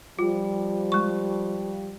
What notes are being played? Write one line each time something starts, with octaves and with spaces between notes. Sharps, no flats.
F3 G3 F4
G#3 C#6